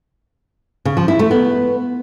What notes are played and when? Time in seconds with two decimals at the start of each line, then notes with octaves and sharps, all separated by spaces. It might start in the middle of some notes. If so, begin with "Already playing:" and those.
0.85 C#3
0.97 F3
1.08 E4
1.19 A3
1.31 B3